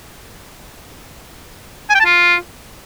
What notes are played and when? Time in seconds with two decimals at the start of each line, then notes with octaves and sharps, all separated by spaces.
1.89 G#5
1.95 G5
2.00 A5
2.05 F4